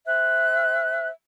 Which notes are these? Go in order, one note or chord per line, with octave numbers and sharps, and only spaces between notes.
C5 E5 G5 F#6